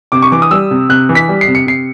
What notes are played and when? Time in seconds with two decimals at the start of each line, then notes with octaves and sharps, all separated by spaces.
0.12 C3 D6
0.22 C#6
0.32 E3 D6
0.42 D#6
0.51 G3 E6
0.71 C3
0.89 C3 F#6
1.09 E3
1.15 B6
1.29 G3
1.41 C7
1.48 C3
1.55 C#7
1.67 C3 C7